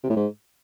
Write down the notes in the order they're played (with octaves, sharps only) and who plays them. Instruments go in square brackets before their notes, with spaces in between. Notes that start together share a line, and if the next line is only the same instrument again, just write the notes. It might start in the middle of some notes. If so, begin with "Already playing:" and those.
[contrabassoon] C3
A2
G#2